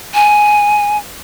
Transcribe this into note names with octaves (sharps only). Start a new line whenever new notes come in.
G#5